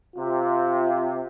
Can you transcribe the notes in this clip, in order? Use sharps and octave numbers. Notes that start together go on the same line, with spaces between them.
C3 F4